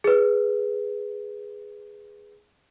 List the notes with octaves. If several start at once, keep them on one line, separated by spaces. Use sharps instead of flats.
G#4 B4